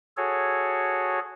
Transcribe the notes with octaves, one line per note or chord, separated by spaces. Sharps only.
F#4 G#4 A4 C#5